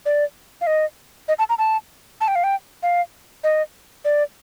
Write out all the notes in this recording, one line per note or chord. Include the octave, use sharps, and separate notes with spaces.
D5
F5
D#5
D#5
A5
A#5
A5
A5
G5
F5
G5
F5
D#5
D5